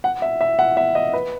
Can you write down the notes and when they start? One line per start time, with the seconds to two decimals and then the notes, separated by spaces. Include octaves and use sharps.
0.04 F#5
0.22 E5
0.41 E5
0.59 F#5
0.77 E5
0.95 D#5
1.13 B4